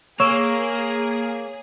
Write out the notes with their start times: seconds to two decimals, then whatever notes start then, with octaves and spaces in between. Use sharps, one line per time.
0.20 A#3 G#4 C#5 C#6 E6 E7